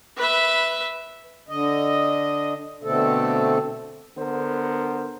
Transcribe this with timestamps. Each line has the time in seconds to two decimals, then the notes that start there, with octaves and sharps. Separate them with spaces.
0.17 B4 E5
1.49 D3 D#5
2.83 B2 D3 A3 C4 A4
4.17 D3 B3 A#4 C5